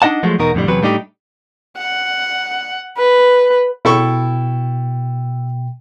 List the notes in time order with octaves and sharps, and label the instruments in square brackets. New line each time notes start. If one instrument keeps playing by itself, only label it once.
[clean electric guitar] D4 D#4 D#5 F#5 A5
F3 F#3 G#3 A3
E2 B2 D#4 F#4 A#4
F2 A2 D3 G3
E2 C3 F#3 B4
A2 G3 A3 D4 D#4 G4
[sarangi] F#5
B4
[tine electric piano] B2 G5 [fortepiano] E4 A4 C#6